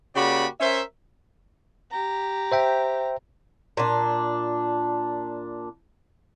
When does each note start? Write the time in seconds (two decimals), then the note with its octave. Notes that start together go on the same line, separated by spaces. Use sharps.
0.16 C#3 A#3 F#4 G4 D5 B5
0.60 C#4 A#4 C5 E5
1.91 G4 A#5
2.52 C5 E5 G5
3.77 A#2 D4